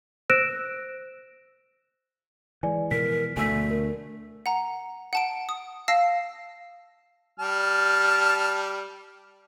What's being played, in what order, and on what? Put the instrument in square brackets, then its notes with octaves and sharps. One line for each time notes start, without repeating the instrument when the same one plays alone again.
[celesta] C5 E6 F#6 A#6 D7 E7
[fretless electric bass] E3 G#3 [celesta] D5 G#5
[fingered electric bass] B2 F3 B3 [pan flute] A#4 [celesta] B6
[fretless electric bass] D2 D3 [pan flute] A3 [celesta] G#5 E6 B6
[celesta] A#4
[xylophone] F#5 A#5
F#5 A5 D7
D#6
F5 A5 E6 A#6 C7
[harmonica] G3 A5 F6